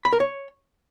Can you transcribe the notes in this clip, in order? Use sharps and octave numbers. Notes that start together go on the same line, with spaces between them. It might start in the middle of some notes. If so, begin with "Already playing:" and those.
B5
A#4
C#5